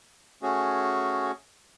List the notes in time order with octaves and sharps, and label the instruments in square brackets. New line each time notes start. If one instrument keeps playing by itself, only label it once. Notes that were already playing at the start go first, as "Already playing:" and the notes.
[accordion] A3 C#4 F#4 G#4